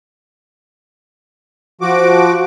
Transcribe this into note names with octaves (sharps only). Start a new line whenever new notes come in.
F3 F#4 D6